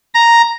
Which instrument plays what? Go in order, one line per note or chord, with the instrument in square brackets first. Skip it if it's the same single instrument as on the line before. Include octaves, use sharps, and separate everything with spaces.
[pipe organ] A#5